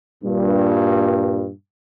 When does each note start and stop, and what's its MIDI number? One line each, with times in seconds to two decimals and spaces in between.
0.23 1.49 43
0.23 1.49 46